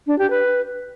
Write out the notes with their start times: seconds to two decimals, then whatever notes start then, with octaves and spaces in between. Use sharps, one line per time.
0.07 D4
0.19 G4
0.30 B4